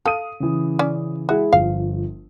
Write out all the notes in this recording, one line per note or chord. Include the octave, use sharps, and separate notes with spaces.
A4 F5 D#6 D#7
C#3 E3
C#4 D5
G#3 E4 F#4 G#4
G1 F3 F5